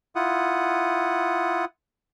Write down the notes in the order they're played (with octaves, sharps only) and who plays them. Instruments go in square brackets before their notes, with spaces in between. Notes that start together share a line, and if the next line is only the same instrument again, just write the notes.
[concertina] E4 F4 F#5 D#6